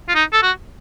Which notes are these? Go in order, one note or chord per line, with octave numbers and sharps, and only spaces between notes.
F4
D#4
A4
F#4